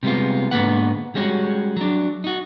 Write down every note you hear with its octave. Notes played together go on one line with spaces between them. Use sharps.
C3 G3 G#3 B3 F4
G#2 D3 A#3 B3 B4 F#5
G3 G#3 C#4 F4 F#4
F#3 D4
D#4 F#4